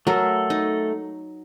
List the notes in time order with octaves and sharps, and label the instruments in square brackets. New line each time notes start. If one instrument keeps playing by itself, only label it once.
[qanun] F#3 A#4 [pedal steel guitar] A3 A4
[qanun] D#4